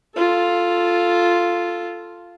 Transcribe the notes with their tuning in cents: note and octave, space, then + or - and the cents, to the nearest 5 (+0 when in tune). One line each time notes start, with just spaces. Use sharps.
F4 +0 A4 +0